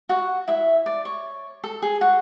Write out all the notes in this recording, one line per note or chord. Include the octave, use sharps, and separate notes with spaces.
F#4 F#5
E4 E5
D5
C#5
A4
G#4
F#4 F#5